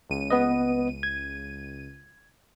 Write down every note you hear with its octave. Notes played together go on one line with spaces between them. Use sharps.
C#2 D#7
B3 B4 D#5
G#6